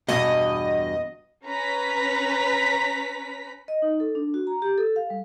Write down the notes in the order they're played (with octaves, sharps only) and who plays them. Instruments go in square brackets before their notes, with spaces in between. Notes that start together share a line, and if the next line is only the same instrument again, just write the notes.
[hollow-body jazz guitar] E2 G2 B2 [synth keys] D#5
[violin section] C#4 B4 A#5 B6
[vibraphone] D#5
D#4
A4
D4
F#4
A#5
G4
A4
F5
G3